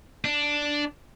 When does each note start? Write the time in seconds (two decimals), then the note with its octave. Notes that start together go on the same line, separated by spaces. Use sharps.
0.25 D4